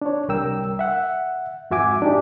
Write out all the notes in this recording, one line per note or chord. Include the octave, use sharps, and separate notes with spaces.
D4 C#5
C2 G3 A#4 G5 E6
E5 F#5
F2 G#2 F#4 E5 G#5 D6
D4 D#4 G4